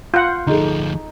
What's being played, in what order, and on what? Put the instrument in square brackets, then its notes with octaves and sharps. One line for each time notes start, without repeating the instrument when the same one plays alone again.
[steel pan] F4 F#5 [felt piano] G6
[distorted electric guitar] D2 F3 [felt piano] D#4 G#4 A4